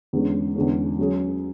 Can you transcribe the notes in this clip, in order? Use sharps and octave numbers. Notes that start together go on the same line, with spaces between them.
E2 D3 G#3 C#4
E2 D3 G#3 C#4
F#3 C#4 G#4